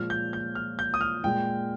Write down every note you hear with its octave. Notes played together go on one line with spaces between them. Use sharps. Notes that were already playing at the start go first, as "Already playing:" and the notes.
Already playing: A#2 F3 G#3 F6
G6
G6
F6
G6
D#6
F6
A#2 G#3 G5